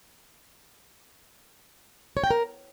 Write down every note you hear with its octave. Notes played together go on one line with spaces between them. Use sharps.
C#5
G5
A#4